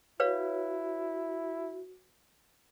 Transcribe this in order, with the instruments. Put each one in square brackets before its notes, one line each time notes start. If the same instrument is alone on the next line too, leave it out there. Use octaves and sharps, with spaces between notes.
[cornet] E4 [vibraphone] F#4 [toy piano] B4 C#5 F5